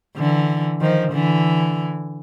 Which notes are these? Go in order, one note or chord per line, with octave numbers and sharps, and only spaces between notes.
D3 E3
D#3 F3
D3 E3